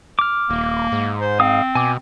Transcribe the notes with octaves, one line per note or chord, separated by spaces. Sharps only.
D6 F6
D#1 A#3
G#2
C5
C4 F5 D#6
B2 G#5 D6